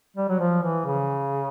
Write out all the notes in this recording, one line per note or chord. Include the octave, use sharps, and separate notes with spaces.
G3
F#3
F3
E3
C#3